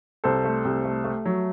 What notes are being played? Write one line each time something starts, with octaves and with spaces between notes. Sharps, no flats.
C2 A4 C5
A3
C2
A3
A3
F#3